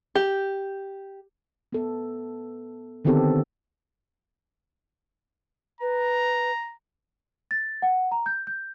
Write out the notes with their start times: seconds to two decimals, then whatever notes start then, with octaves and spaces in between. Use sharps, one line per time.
0.15 G4
1.72 B3 A4
3.05 D3 D#3 B3 C4 G4 A4
5.81 B4 A#5
7.51 A6
7.82 F#5
8.11 A#5
8.26 G6
8.47 G6